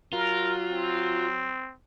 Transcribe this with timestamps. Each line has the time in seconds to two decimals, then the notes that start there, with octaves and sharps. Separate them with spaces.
0.13 F#3 F4 A#4
0.72 C4